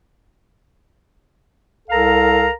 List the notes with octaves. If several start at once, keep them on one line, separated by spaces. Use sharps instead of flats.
C2 A4 A#4 F5 A#5